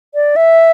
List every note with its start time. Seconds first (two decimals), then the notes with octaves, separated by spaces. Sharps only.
0.15 D5
0.36 E5